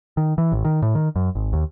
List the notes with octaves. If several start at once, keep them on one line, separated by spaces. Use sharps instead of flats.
D#3
E3
A1
D#3
A2
D#3
F#2
G#1
D#2